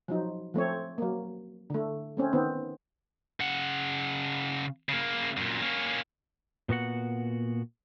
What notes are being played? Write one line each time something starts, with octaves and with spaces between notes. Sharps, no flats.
F3 F#3 D#4
F3 A3 C4 C#5
F#3 A#3
D3 A3
A3 C4 C#4
D#3 B3 C4
C#3 F#5
C#3 A#3
F#2 A#2
A#3 C#4
A#2 B3 F#4 F#5